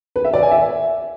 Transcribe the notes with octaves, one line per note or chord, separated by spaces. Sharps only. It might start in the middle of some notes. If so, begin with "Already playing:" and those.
B4
E5
D5
G#5
E5